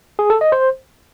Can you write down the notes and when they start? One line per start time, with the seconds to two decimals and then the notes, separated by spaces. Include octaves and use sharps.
0.19 G#4
0.30 A4
0.41 D#5
0.52 C5